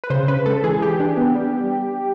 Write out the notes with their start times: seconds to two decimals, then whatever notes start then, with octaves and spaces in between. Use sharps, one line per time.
0.04 B4
0.10 C#3 C5
0.28 C#3 B4
0.46 G#3 A4
0.64 E3 G#4
0.82 E3 G4
1.00 D4
1.17 B3
1.35 G3